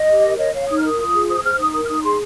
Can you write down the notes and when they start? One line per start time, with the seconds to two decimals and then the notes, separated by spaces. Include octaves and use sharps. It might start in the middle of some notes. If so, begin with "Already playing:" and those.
Already playing: D#5
0.08 G4
0.23 A#4
0.38 C#5 D#5
0.54 C#5 F5
0.68 D#4 D#6
0.77 F6
0.83 A#4 D#6
0.98 F4
1.13 G#4
1.28 C5 D#6
1.43 C5 F6
1.58 D#4 D#6
1.73 A#4 D#6
1.84 F6
1.88 D#4 D#6
2.03 G#4 C6